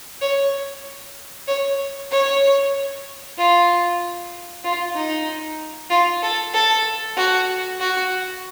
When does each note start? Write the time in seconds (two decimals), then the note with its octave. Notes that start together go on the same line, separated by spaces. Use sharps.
0.21 C#5
1.48 C#5
2.11 C#5
3.37 F4
4.64 F4
4.95 D#4
5.90 F4
6.23 A4
6.53 A4
7.17 F#4
7.80 F#4